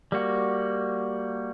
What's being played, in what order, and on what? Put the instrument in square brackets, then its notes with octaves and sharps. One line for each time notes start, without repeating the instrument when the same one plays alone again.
[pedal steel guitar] G3 A#3 F#4